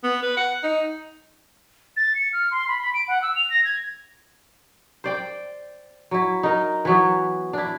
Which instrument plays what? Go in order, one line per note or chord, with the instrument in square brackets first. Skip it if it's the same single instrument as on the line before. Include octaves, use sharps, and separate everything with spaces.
[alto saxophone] B3
B4
F#5
D#4
[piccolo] A6
C#7
F6
C6
B5
B5
D7
F#5
E6
F7
A#6
G#6
[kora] C5 D5 G5
F#3 E4
D#4 A#4
E3 F#3 B3
D4 E4